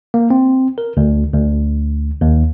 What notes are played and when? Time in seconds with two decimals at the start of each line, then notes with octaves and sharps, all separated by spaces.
0.14 A#3
0.30 C4
0.78 A#4
0.97 D2
1.34 D2
2.21 D#2